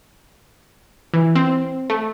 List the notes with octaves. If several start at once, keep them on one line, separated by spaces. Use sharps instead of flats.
E3
C4
A3